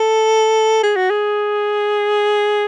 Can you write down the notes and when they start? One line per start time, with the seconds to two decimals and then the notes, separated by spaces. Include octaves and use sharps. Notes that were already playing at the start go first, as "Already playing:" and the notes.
Already playing: A4
0.83 G#4
0.96 F#4
1.10 G#4